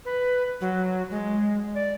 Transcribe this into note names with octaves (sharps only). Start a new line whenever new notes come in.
B4
F#3
G#3
D5